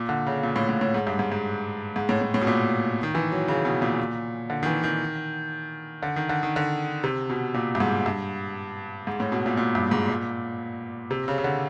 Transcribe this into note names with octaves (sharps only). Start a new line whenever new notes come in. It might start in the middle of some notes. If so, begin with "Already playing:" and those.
Already playing: A#2
D3
C#3
A#2
A2
A2
A2
G#2
G2
G#2
G#2
G#2
A2
A2
A2
B2
A#2
D#3
E3
F#3
C#3
B2
A#2
D3
D#3
E3
D#3
D3
D#3
D3
D#3
D3
C3
B2
A#2
G2
G#2
G2
G#2
A2
B2
A#2
A#2
G2
G#2
A#2
C3
C#3
C#3
D3